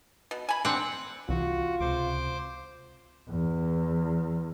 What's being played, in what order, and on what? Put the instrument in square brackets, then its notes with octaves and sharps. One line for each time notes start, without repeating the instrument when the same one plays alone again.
[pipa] B2
G#5 B5
[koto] C4 F#5 [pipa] D4
[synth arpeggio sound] C2 E3 [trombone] F4 [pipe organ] F#4
[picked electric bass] C#2 C3 [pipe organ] C5 D6
[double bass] E2